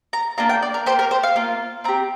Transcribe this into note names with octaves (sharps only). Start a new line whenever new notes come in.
A#5
A#3 D4 F4 A#5
G5
D5
A#4
A#3 G4 C5
A#4
C5
F5
A#3 F4
C4 G4 A#5